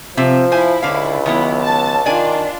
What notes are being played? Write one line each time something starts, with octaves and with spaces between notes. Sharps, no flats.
C3 F3 C4 E5
E4 C5 G#5
C#2 D3 F5
D#3 F#3 B3 E4
A5
D#3 D4 F4 D5 G#5